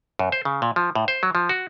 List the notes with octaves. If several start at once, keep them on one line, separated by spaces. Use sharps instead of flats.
F#2
C5
C#3
A#2
F3
A2
C5
F#3
F3
F#4